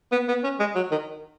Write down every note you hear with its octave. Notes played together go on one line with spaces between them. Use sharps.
B3
B3
C#4
G#3
F#3
D#3